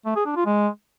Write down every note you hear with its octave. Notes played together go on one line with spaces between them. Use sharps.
A3
G#4
D4
F4
G#3